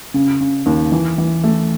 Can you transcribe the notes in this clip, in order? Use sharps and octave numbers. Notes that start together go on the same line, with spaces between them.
C#3
C#3
D#2
E3
E3
A3